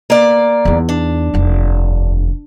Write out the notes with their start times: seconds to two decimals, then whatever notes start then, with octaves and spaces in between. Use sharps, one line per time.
0.10 A#3 D5
0.65 E2 D#4
0.89 D4
1.34 F1 D#2